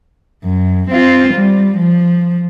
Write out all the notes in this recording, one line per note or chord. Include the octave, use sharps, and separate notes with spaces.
F#2
C4 F4
G3
F3